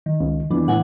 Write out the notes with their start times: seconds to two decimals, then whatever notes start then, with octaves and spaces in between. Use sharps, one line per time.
0.06 D#3
0.20 C#2 C#3
0.50 F2 E3 B3 D4
0.68 A2 E3 F#5 G#5